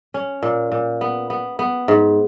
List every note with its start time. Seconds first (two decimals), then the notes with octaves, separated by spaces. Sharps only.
0.14 C#4
0.43 A#2
0.72 A#2
1.01 B3
1.30 B3
1.59 B3
1.88 G#2